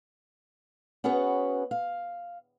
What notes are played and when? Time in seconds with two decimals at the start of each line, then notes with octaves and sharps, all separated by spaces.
1.04 B3 C#4 F#4 G#4 B4 C#5
1.71 F5